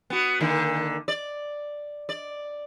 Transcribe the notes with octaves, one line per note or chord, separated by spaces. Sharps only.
B3 F#4
D3 D#3 A#3
D5
D5